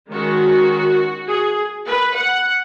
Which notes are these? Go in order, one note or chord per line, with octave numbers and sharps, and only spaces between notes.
D#3 G#3 C#4 F#4
G#4
B4
F#5